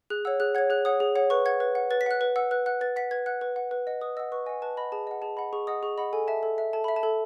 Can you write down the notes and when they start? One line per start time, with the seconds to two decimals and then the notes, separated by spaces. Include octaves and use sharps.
0.10 G#4 F#6
0.25 C#5 F#5 E6
0.40 G#4 F#6
0.55 C#5 F#5 G#6
0.70 G#4 F#6
0.85 C#5 F#5 D#6
1.00 G#4
1.15 C#5 F#5
1.30 B4 C#6
1.46 F#5 G#6
1.60 B4
1.75 F#5
1.91 B4 A6
2.01 B6
2.06 F#5 F#6
2.21 B4
2.36 F#5 E6
2.51 B4 F#6
2.66 F#5 F#6
2.81 B4 A6
2.96 F#5 B6
3.11 B4 G#6
3.26 F#5 F#6
3.41 B4
3.56 F#5
3.71 B4
3.87 D#5 F#5
4.01 B4 D#6
4.17 D#5 F#5 E6
4.32 B4 C#6
4.46 D#5 F#5 G#5
4.62 B4 A5
4.77 D#5 F#5 B5
4.92 G#4 A5
5.07 D#5 F#5
5.22 G#4 A5
5.37 D#5 F#5 B5
5.53 G#4 C#6
5.67 D#5 F#5 D#6
5.83 G#4 C#6
5.98 D#5 F#5 B5
6.13 A4 G#5
6.28 E5 A5
6.43 A4
6.58 E5
6.73 A4 A5
6.84 E5 B5
6.96 A5
7.03 A4